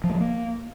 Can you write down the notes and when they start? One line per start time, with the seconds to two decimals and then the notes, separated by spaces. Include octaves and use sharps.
0.04 F3
0.09 A#3
0.15 F#3
0.20 A#3